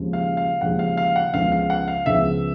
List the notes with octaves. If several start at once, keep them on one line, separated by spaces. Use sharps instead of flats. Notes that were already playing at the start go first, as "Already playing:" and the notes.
Already playing: D#2 C#3 F3 G#3
F5
F5
D#2 C#3 F3 G#3 F#5
F5
F5
F#5
C#2 C#3 F3 G#3 B3 F5
F5
F#5
F5
C#2 C#3 F3 G#3 B3 E5